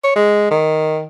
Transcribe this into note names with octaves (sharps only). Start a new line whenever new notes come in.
C#5
G#3
D#3